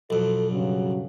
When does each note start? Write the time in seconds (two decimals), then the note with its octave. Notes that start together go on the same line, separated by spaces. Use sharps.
0.10 B1 F2 A4
0.50 G2 C#3 F#3